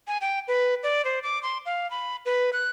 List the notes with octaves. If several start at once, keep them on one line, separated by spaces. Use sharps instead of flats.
G#5
G5
B4
D5
C5
D6
C6
F5
B5
B4
F#6